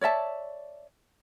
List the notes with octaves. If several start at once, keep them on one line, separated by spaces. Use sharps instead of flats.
C#5 D5 E5 A5